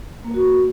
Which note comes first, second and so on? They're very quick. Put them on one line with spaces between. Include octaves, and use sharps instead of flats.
A#3 A#4 F#4